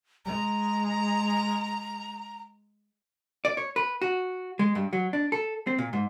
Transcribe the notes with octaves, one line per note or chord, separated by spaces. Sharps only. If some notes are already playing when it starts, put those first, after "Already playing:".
G#3 A#5
D5
C#5
B4
F#4
G#3
G2
F#3
D4
A4
C4
A#2
G#2